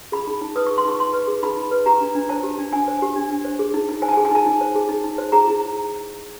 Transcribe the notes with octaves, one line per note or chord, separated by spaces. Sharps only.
G#4 B5
D#4
D#4
B4 D#6
G#4 C#6
C6
D#4 C#6
D#4 C6
B4
G#4
D#4 B5
D#4
B4
G4 A#5
D4
D4
C5 A5
G4
D4
D4 G#5
C5
G4
D4
D4
C5
G#4
D#4
D#4
C5 G#5
A5
G#5
G#4
G#5
D#4 A5
D#4
C5
G#4
D#4
D#4
C5
G#4 A#5
E4